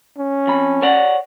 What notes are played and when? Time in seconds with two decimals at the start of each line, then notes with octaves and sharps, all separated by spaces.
0.18 C#4
0.47 F2 B5
0.82 C#5 D5 F#5